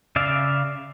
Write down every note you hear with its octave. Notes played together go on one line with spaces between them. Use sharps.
C#3 D5 E5 F5